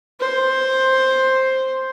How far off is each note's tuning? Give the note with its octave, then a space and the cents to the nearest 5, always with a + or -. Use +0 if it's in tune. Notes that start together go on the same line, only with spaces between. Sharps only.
C5 +5